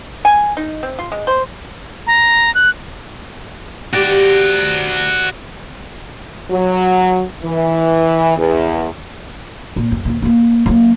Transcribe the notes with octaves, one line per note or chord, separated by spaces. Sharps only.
G#5
D#4
C4
F4
G#3
C5
A#5
F#6
F#4 G4 D5
F#3
E3
E2
A#2
F#2
D#2 A#2
A3 A#3
F#3 A#3